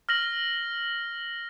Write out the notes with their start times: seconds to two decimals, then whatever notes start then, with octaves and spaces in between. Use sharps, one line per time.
0.09 F6 A#6 F#7